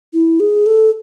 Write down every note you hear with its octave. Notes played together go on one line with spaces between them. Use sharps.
E4
G#4
A4